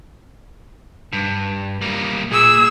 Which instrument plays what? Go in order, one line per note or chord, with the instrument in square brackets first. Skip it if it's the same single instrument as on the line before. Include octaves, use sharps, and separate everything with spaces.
[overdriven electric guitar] G2
G3 A#3
[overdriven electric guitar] A#2 [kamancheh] G#4 E6